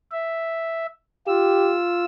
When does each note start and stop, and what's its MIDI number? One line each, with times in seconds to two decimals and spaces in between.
0.11 0.86 76
1.27 2.05 65
1.27 1.76 67
1.27 2.05 88